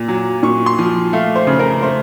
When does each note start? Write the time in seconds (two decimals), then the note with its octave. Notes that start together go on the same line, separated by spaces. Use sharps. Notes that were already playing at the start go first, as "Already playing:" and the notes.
Already playing: A#2
0.08 F#3
0.43 A#2 C#6
0.66 C6
0.79 F3
1.13 A3 F5
1.36 C5
1.47 C#3
1.59 A#4
1.83 A3 C5